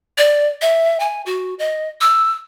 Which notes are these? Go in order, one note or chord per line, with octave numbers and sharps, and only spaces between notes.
D5
E5
G#5
F#4
D#5
E6